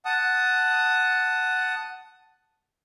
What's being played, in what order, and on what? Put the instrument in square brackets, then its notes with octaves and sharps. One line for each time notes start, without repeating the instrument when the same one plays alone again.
[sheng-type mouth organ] F#5 A5 D#6